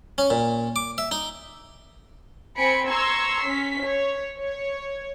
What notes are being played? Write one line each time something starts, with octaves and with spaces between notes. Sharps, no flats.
C#4
A#2
D6
E5
D#4
C4 G#5 B5 C#7 D7
A#5 C6 C#6 E6 G#6
C#4 B6
C#5
C#5